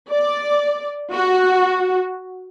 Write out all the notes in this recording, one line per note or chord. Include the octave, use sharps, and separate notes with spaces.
D5
F#4